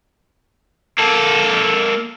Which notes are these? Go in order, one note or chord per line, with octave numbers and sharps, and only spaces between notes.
A#3 A4